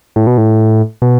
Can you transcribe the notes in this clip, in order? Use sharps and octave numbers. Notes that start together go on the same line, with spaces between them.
A2
B2
A2
B2